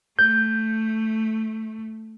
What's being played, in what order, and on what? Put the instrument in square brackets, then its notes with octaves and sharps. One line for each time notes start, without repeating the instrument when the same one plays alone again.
[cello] A3 [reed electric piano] G6